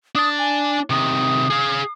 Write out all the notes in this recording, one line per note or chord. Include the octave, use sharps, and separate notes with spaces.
D4 A5 D#6
G#5
C3 D#3 D#6
G#4 F5